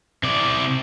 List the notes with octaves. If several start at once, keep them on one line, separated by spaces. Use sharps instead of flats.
C3 D5